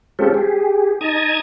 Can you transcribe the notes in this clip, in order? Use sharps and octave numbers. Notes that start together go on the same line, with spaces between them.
G#3 C4 C#4 F4 G4 A4
G4 G#4
D#4 A5 A#5 D#6 G#6